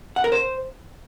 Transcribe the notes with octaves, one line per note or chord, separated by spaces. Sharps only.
F#5
A#4
C5